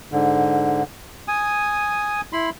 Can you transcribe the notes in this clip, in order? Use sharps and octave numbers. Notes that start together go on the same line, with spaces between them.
G#2 D3
G#5 D#6
E4 B5 C6